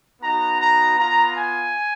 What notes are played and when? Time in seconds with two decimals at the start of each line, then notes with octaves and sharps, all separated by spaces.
0.21 B3 D#4 F#4 A#5
0.58 A#5
0.97 B3 F4 A#5
1.35 G#5